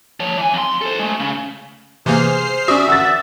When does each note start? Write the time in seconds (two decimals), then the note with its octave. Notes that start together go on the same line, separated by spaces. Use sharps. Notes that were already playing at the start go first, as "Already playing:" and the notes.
0.20 F3 C#5
0.38 E3 G#5
0.54 F2 C6
0.81 A4 C5
0.99 G#3 A3
1.20 C#3
2.06 C3 E3 A#3 G#4 C5 F6 C7
2.68 C#4 F#4 D5 E5 D#6
2.88 F#5 E6 A6